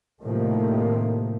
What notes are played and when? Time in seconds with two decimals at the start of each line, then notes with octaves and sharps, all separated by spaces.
0.22 A2 C3 D#3 F3 A3 A#3